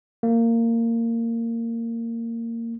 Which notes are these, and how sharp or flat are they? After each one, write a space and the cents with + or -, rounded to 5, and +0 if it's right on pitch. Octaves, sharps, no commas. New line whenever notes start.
A#3 -20